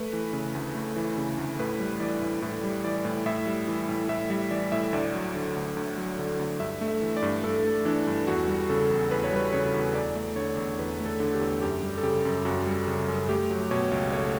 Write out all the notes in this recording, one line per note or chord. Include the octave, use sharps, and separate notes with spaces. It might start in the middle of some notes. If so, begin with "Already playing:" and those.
Already playing: A3 B4
E3
C#3
D2
A3
E3
C#3
D2
A2 B4
G3
E3 D5
A2
A2
G3
E3 D5
A2
A2 E5
G3
E3
A2
A2 E5
G3 E5
E3 D5
A2 E5
D2 D5
F#3
D3
D2
D2
F#3
D3
D2
G2 E5
A3
E5
E3
D5
G2
G2 A4
A3
E3 D4
G2
E2 F#4
G3
C#3 A4
E2
E2 B4
C#5
G3 B4
C#3 C#5
E2
E2 D5
A3
D3 C#5
E2
E2 B4
A3
A4
D3
G4
E2
F#2 G4
G3
A4
C#3 G4
F#2
F#2 F#4
G3
C#3
F#2
A3 G4
F#3
B2 C#5
C#2
A3 C#5